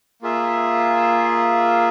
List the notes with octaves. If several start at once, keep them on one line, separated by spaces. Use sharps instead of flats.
A#3 F4 G#4 E5